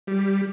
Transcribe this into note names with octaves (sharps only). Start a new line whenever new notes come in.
G3